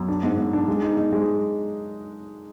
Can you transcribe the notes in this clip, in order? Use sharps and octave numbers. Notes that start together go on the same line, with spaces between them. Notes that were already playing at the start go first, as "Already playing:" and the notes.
Already playing: F#2
D4
G#2
G#2
D4
G#3
D#4
D#4
G#3